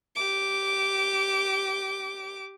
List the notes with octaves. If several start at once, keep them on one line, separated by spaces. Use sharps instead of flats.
G4 D6